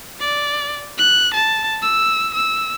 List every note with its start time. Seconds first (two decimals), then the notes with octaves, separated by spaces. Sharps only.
0.20 D5
0.98 F#6
1.34 A5
1.82 E6
2.34 E6